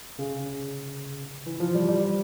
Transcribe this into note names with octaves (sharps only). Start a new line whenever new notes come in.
C#3
E3
F3
G3
G3